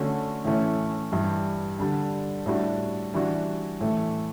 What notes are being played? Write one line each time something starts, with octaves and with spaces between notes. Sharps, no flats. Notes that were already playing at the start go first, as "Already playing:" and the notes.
Already playing: D3 A3 C#4 F#4
A2 E3 A3 C#4
G2 E3 G3
D3 G3 D4
A2 G3 D4 F#4
E3 G3 D4 F#4
A2 E3 A3